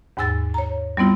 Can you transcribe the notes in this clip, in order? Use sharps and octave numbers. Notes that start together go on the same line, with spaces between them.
D#2 G#2 G#5 E6 A6
C#5 A#5
G3 B3 C4 E4 F4